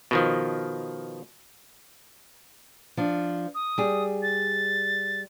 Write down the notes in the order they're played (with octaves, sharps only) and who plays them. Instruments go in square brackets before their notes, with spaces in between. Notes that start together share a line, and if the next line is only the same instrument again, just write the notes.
[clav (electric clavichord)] B2 D#3 F3
[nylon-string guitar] F3 D4
[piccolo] D#6
[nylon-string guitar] G3 G#4
[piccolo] A6